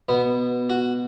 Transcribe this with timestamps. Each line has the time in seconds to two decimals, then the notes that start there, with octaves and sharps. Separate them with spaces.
0.09 B2 B3
0.70 F#4